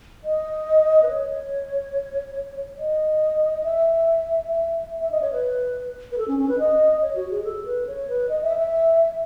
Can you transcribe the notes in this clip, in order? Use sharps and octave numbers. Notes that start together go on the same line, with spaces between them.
D#5
B4
C#5
D#5
E5
E5
E5
D#5
C#5
B4
B4
A4
C#4
C#4
B4
D#5
C#5
F#4
G#4
A4
B4
C#5
B4
D#5
E5
E5